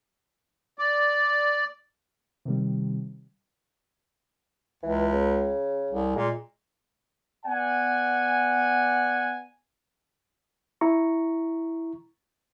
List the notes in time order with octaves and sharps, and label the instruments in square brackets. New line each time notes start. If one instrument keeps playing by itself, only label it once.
[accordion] D5
[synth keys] C3 D#3 G3
[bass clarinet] C#2 [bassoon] E3
[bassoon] C#3
[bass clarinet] C2
[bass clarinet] A#2 [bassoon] G#3
[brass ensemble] B3 D5 F#5 G#5
[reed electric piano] E4 A#5 C#6